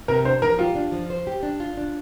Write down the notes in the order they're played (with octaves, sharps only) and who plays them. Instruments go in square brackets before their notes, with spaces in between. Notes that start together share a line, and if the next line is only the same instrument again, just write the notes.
[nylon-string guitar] C3 [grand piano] A#4
[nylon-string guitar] D4 [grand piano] C5
[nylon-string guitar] F3 [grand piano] A#4
[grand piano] F4 [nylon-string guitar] G4
[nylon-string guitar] D4
F3
C5
G4
D4
F4
D4